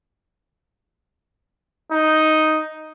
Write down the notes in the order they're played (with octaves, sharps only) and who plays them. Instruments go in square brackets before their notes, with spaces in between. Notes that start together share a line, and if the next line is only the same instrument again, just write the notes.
[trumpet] D#4